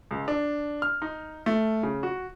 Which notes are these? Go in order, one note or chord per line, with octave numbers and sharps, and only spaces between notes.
C#2
D4
F6
D#4
A3
C#3
F#4